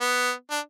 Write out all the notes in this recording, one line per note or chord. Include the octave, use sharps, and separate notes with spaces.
B3
D4